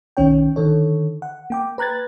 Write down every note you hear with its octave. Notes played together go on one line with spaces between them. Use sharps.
B1 D#3 C#4 C#5 G5
D3 D#3 A4 C#5
F#5
A#3 G5 D6
B4 A#5 F#6 G#6 A6